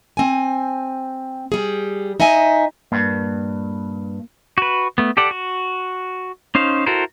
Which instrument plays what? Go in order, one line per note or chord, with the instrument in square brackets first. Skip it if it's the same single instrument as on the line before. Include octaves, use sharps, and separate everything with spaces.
[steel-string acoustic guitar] C4 G#5
G3 G#4
D#4 D#5 E5 G#5
[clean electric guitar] G2 [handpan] A#3
[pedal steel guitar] F#4 B4
A3 B3
G4 A4 D5 F#5
F#4
C#4 D#4 C5 F5
E4 F#4 A4 A#4 C5